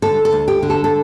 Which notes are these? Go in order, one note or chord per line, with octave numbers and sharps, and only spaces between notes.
D3 A4
A4
D2
G4
D3
A4
A4